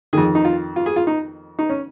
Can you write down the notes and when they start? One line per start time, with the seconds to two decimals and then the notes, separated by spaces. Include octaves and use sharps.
0.13 D#3 G#4
0.18 F2
0.35 D#4
0.45 F4
0.76 F4
0.86 G#4
0.96 F4
1.07 D#4
1.59 D#4
1.70 C#4